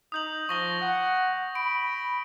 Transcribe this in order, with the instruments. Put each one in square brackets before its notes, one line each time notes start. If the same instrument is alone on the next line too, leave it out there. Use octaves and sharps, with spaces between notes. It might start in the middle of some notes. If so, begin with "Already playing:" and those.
[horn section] D#4 [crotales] D#6 G6 F#7
[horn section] F3 [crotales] C#6 A#6 G7
[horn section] F#5
[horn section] B5 [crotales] D7